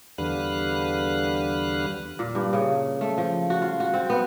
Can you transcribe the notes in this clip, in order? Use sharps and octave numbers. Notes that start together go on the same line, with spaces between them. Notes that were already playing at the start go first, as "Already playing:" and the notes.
E2 D3 G3 B4 F5 F#6
A#2
G2
C#3
A3
F3
F#4
F4
F#4
C4
B3